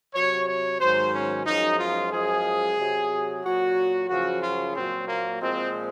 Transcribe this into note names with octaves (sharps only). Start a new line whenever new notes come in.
C3 F#3 C#5
C#5
G#2 D#3 F#3 C5
C#4
F#2 F3 G#3 D#4
F4
F#2 F3 G#3 G#4
C3 F#3
A#2 F#3 F#4
F#2 C#3 F3 F#4
F4
A#2 F#3 C4
A#3
A#2 F3 G#3 C4